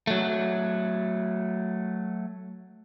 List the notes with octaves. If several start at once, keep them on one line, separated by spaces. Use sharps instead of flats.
F#3 A3